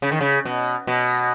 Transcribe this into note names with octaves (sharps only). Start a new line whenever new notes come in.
C#3
D#3
C#3
B2
B2